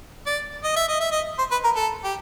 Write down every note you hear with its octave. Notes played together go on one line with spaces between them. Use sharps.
D5
D#5
E5
D#5
E5
D#5
C5
B4
A#4
A4
G4